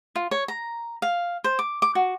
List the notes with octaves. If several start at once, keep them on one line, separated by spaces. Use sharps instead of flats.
F4
C#5
A#5
F5
C5
D6
D6
F#4